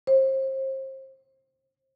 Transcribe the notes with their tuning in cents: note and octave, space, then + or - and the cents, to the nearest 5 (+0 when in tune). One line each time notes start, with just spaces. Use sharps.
C5 +35